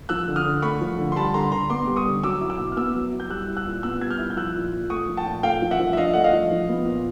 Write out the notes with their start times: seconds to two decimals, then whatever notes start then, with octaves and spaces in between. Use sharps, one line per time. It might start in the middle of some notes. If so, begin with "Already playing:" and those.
0.09 F3 E6 F#6
0.28 D3
0.36 D#6 F6
0.45 D3
0.62 A3 B5 C#6
0.81 F3
0.98 D3
1.12 C6
1.16 G3 A5 B5
1.34 D3 A#5 C6
1.44 B5
1.52 D3 A#5 C6
1.70 B3 C6 D6
1.87 G3
1.96 C#6 D#6
2.05 D3
2.24 F#3 D6 E6
2.41 E4
2.50 D6 E6
2.58 B2
2.72 F6
2.77 B3 D6 E6
2.95 F#3
3.12 E4
3.20 G6
3.30 G3 E6 F#6
3.48 E4
3.57 E6 F#6
3.65 A#2
3.83 B3 E6 F#6
4.01 G3 G#6
4.10 F6 G6
4.19 E4
4.30 G6
4.36 F3 E6 F#6
4.55 A#2
4.73 A#2
4.90 A3 C#6 D#6
5.08 F3
5.17 G5 A5
5.26 A#2
5.43 A3 F5 G5
5.62 F3
5.71 E5 F#5
5.79 F3
5.93 E5
5.97 D4 D#5 F5
6.14 A3 F#5
6.24 D#5 F5
6.33 F3
6.51 F3
6.69 B3
6.86 A#2